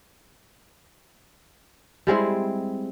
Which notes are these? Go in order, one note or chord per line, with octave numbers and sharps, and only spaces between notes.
G3 G#3 C4 E4